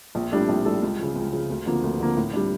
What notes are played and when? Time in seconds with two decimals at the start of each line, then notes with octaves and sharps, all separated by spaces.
0.15 A#1
0.32 A2 G3 D4 A4
0.49 A#1
0.65 A2 G3 D4 A4
0.82 C#2
0.99 C#3 F3
1.16 C#2
1.32 C#3 F3
1.50 D2
1.66 D3 F3 A#3
1.83 D2
2.00 D3 F3 A#3
2.17 A2
2.33 G3 D4